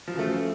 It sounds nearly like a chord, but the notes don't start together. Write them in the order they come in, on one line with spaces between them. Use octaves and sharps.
F3 F#3 C#3 A3